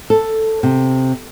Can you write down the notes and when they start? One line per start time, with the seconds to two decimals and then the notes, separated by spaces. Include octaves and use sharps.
0.10 A4
0.63 C3